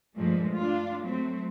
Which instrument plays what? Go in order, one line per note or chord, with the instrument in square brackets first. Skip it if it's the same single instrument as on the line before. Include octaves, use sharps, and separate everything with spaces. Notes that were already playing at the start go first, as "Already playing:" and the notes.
[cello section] G2 A#2 F3 G#3 A3
D4 F4
F#3 A3 C4